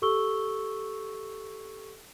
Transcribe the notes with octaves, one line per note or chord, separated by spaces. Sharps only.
G4 A4 C#6 E6 G7